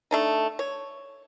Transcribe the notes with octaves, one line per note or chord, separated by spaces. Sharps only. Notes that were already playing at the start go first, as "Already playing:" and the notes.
A3 D4 D#4
C#5